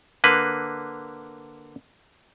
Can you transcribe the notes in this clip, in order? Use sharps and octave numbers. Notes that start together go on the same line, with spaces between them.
D3 A#3 B4